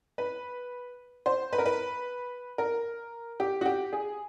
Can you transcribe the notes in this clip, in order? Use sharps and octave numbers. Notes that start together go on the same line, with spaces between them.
B4
C5
B4
A#4
B4
A#4
G4
F#4
G4
G#4